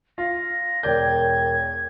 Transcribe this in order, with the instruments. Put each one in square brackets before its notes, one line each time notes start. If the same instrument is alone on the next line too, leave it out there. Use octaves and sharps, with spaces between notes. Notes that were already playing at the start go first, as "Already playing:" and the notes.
[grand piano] F4 [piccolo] A#6
[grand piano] E1 D5 G6 [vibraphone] A#4 C#5 G5 [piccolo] G#6